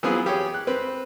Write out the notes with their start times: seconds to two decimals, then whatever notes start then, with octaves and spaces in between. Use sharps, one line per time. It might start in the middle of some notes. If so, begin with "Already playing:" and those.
0.03 E3 F#3 B3 C4 F4 G#4
0.26 G4 G#4 C#5
0.54 F#6
0.67 C4 B4